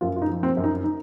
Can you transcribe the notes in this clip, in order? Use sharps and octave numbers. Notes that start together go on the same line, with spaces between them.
F#2 F4
F4
D#4
F3
C4
F#2
D#4
D#4